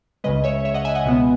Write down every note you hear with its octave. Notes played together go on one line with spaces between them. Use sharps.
C#2 C#3 G#3 B4 D#5
C#5 E5
C#5 E5
D#5 F#5
E5 G#5
D#5 F#5
C#2 B2 G#3 B3